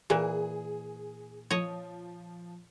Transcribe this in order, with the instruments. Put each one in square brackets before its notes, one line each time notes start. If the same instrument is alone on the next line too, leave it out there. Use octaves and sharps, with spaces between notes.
[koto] A#2 E3 [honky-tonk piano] G#4
[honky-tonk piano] F3 [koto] C#5 D#5